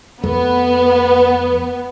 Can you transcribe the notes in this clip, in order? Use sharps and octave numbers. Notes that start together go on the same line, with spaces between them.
F2 A3 B3